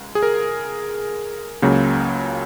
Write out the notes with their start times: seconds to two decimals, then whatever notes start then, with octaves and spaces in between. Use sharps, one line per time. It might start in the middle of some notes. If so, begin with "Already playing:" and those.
Already playing: C#2
0.15 G#4
0.23 A#4
1.62 C#2 C#3 F#3 A#3